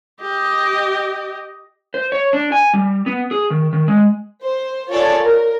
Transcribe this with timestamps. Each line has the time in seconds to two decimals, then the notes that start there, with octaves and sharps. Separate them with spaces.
0.21 G4 D#5
1.94 C5
2.12 C#5
2.33 D4
2.52 G#5
2.73 G3
3.06 B3
3.31 G#4
3.50 D#3
3.73 D#3
3.88 G#3
4.44 C5
4.91 F4 G#4 A4 C#5 D5
5.21 A#4